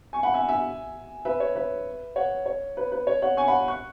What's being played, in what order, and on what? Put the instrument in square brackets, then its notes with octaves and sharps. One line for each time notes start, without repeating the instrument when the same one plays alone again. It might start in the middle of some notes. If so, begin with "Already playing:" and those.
[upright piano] G#5 C#6
F#5 B5
E5 G#5
E5 G#5
B4 E5
C#5
B4 E5
C#5 F#5
C#5
B4
B4
C#5
C#5 F#5
G#5 C#6
F#5 B5
C#6 F#6